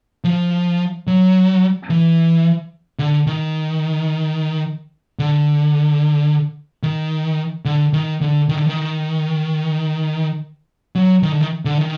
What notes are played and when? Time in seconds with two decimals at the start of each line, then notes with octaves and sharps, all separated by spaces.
0.24 F3
1.07 F#3
1.90 E3
2.99 D3
3.27 D#3
5.19 D3
6.83 D#3
7.65 D3
7.93 D#3
8.21 D3
8.49 D#3
8.57 D3
8.66 D#3
10.95 F#3
11.23 D#3
11.32 D3
11.40 D#3
11.65 D3
11.78 D#3